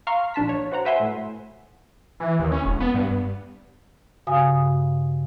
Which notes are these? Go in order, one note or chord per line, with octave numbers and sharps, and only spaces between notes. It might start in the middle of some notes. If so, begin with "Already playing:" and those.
F5 A#5 C6 C#6 F6
A#1 D4 A5 B6
C#5
F#4 C5 F#5 A#5
B4 C5 E5 F#5 G#5 C6
A2
E3
D#2
C#4
E1
B3
G2
G2 C#3 F#4 F5 G#5 D#6